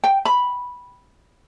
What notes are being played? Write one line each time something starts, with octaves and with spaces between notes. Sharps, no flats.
G5
B5